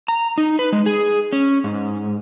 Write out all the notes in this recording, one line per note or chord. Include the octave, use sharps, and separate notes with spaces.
A#5
D#4
B4
G#3
G#4
C#4
G#2